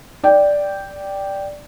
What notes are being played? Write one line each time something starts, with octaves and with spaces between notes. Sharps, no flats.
D5 G5